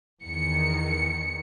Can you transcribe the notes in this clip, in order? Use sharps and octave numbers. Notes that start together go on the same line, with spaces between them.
E2 D#3 C#7